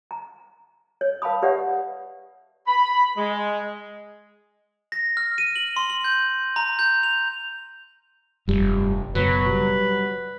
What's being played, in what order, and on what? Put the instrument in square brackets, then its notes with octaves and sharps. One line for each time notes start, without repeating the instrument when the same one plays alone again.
[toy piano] A#5
C#5
B4 F5 A5 B5 D#6
G4 B4 C#5 D5 E5 F#5
[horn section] B5
G#3
[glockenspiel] A#6
F6
D#7
F#7
C6
F#7
G6
A#5
G6
F7
[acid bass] F1 [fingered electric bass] G2 G3
[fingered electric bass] F#1 B2 [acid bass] F#3 [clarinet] B4
[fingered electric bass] G3